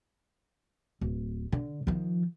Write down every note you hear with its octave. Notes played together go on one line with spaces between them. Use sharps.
D1
D3
D#3 F3